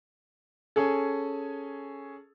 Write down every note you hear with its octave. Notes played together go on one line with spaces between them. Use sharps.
C#4 G#4 A4